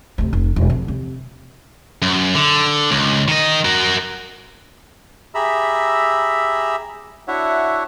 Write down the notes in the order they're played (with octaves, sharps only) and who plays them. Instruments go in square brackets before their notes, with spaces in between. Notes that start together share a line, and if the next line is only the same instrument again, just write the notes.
[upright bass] D2 C3
F1
E1
F2
C3
[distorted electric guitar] F#2
D3
C#2
D#3 D#5
F#4 A#4
[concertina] G4 G#4 E5 A#5 B5 E6
D4 E4 F#4 C#5 E5 F#5